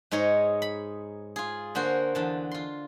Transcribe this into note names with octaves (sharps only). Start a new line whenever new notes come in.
G#2 G#3 D#4 C#5 A#5
B5
F4 G#4
D3 A#3 F#4 C5
E2 D3 A5
F4 C6